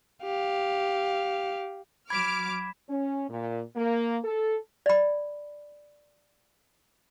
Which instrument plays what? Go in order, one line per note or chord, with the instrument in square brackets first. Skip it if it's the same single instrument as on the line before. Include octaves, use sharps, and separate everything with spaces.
[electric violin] G4 F5
[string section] F#3 D6 F6 [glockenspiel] B5 B6 E7 [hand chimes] G#6
[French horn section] C#4
A#2
A#3
A4
[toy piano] D5 B5